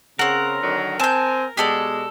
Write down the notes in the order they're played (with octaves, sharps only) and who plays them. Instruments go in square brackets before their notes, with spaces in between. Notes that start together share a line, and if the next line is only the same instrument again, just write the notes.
[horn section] C#3 [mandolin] C4 F#5 [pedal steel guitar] A#4
[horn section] D3 D#3 F#3
[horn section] C4 G#5 [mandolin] A5 G6
[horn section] B2 G#3 [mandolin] G4 A4 D5